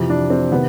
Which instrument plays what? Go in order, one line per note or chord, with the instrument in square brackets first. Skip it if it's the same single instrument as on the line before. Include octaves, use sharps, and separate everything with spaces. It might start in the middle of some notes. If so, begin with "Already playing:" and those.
Already playing: [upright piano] F2 C3 E3
D4
C4
C3 D#3 B3